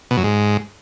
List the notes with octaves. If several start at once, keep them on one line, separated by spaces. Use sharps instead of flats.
B2
F#2
G#2